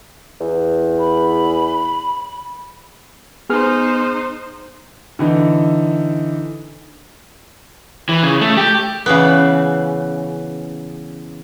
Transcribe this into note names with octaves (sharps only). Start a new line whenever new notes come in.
E2
B5
B3 D#4 G#4 C5 F6
D3 E3 D#4
E3
C#3
A3
G4
C#3 E3 B3